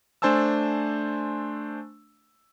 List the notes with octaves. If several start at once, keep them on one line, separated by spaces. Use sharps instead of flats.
A3 D4 C5 G#5 A5 E6